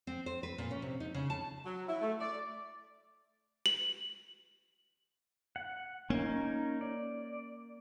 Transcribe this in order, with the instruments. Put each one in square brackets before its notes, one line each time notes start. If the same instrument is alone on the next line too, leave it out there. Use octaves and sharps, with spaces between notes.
[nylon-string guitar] C4
C5
B4
A#2
C#4
C3
D#4
C#3
A5
[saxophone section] F#3
E4
A3
D5
[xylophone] F#7
[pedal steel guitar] F#5
[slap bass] A#3 [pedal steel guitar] C#4 D#4
[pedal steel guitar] D5